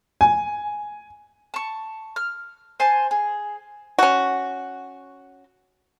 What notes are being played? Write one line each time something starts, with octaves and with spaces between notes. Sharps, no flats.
G#5
A5 C#6
F6
C5 G#5 A5
G#4
C#4 F#4